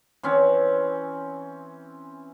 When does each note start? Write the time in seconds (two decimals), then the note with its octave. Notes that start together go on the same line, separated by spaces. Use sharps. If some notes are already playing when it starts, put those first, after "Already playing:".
0.23 E3 C4 C#4